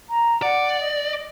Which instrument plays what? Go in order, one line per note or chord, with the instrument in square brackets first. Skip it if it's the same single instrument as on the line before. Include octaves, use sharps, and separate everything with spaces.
[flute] A#5
[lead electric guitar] D5 [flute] F#5
[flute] D#5